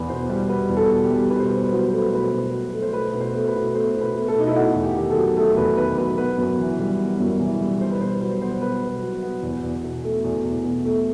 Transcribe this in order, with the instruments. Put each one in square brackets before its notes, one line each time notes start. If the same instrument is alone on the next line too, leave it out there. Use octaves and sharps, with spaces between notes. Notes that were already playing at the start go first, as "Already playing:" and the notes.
Already playing: [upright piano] E2 B3 B4
B2 C5
G3
B3 B4
E2
A4
B2
G4
G3
B2 B4
C5
B4
B2 C5
B4
F#3 C5
B4
A3 C5
B4
C5
B2 B4
B2
F#3
A3
C5
A3 B4
B2
C5
A3
B4
B2
A3 C5
B2
B4
A3
A4
B2 D#4
E4
A3 F#4
E2
G4
D#3
A4
F#3
A3 A4
E2 B4
D#3 B4
F#3 B4
B3 B4
F#2
E3
G3
B3
F#2
E3
G3
B2 C5
B4
B2 C5
F#3 B4
B3 C5
B2 B4
B2
F#3
B3
E2
E2
B2
A3
E2
E2
B2
A3